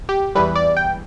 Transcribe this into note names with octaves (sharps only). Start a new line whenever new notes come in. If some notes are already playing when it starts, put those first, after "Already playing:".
G4
E2 E3 G3 B4
D5
G5